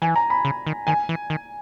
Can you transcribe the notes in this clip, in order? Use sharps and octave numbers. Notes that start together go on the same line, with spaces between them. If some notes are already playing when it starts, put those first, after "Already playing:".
E3 G#5
A#5
B5
C#3
D#3
D#3 G#5
E3
D#3